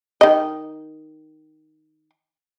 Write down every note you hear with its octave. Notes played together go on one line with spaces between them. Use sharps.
D#3 D#5